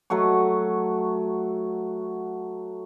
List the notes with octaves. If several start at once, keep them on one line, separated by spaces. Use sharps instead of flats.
F#3 A3 F#4 C#6